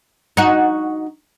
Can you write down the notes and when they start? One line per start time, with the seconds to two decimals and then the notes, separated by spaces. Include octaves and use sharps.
0.37 D#4 F#4